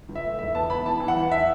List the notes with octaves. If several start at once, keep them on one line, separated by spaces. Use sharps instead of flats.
C#2
E5
A3
E1 E5
B3 A5
B3 B5
E3 A5
E3
F#5
E2
E5